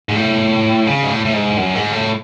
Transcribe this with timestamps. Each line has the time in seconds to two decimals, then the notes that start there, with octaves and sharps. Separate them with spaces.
0.09 G#2
0.16 A2
0.87 C#3
1.02 G#2
1.10 A2
1.25 A2
1.34 G#2
1.57 F#2
1.75 G#2
1.93 A2